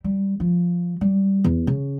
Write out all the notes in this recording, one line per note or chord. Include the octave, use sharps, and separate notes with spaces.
G3
F3
G3
E2
C#3